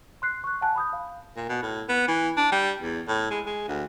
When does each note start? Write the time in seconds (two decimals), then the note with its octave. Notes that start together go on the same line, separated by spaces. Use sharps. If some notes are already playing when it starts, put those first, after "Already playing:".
0.22 C6 F#6 C7
0.44 C#6 F#6
0.61 F#5 G#5 A5 F#6
0.76 B5 D#6 G6
0.93 F5
1.36 A#2
1.49 B2
1.63 A2
1.89 B3
2.08 E3
2.37 D4
2.52 G3
2.81 E2
3.08 A2
3.31 G#3
3.46 G#3
3.68 D2